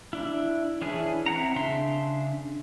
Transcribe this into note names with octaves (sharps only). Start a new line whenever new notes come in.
D4 E4
E3 C#4 D4 E4 G#4
C4 E4 F#5 A#5
C#3 D4 E5 C6